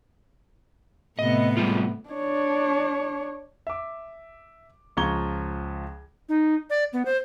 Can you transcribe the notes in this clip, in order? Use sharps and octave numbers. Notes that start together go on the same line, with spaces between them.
A2 C3 B3 D#5
G3 G#3 F4
D4 C#5
E5 D6
C#2 F3 A#5 C#6 G#6 G7
D#4
D5
B3
C5